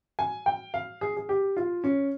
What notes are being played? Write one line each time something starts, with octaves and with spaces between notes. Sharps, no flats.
G#5
G5
F5
G#4
G#4
G4
F4
C#4